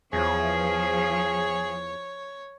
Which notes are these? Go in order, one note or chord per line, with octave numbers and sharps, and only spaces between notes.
E2 F3 G#4 C#5